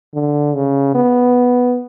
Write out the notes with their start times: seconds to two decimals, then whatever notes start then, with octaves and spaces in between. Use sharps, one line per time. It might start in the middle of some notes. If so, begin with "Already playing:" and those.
0.14 D3
0.55 C#3
0.95 B3